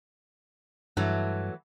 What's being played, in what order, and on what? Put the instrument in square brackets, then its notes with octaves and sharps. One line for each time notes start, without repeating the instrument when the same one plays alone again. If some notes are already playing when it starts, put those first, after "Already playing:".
[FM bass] G2 [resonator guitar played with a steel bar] E3 F#3 A3